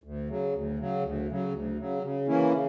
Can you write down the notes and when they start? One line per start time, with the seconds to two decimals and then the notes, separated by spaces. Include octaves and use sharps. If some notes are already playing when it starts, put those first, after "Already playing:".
0.04 D2
0.29 C#3 F#3
0.53 D2
0.79 C#3 F#3
1.03 D2
1.28 C#3 F#3
1.53 D2
1.78 C#3 F#3
2.02 C#3
2.28 E3 A#3 C#4 E4
2.52 C#3